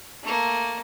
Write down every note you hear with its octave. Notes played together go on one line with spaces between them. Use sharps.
A3 A#3